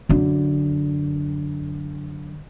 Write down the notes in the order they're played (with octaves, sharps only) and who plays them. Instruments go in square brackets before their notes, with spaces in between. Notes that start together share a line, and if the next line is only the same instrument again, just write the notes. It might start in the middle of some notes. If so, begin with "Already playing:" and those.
[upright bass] F#2 D3